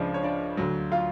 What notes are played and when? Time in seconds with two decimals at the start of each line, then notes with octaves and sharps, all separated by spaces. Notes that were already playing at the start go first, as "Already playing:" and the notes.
Already playing: C#2 C#3 F3 D4 D5
0.14 C#5
0.23 D4 D5
0.57 D2 D3 F#3
0.92 F4 F5